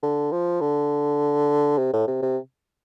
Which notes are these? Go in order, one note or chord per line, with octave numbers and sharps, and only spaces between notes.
D3
F3
D3
C3
A2
C3
C3